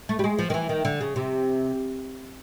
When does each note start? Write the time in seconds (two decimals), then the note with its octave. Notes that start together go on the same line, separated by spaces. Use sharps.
0.09 A3
0.19 G3
0.24 G#3
0.39 F3
0.50 D#3
0.54 E3
0.69 D#3
0.85 D3
1.01 C#3
1.16 C3